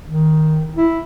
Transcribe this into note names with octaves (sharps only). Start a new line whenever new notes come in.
D#3
E4